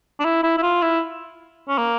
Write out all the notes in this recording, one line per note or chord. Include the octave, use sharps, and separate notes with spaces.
D4
E4
E4
E4
F4
E4
C#4
A#3